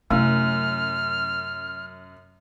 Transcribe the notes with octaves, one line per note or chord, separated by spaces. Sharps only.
F#2 C3 A3 E4 F6